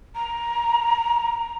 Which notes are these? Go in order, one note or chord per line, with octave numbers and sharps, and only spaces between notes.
A#5